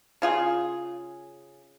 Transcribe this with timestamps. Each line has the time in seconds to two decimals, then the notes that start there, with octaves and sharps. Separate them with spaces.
0.22 C#3 F4 G#4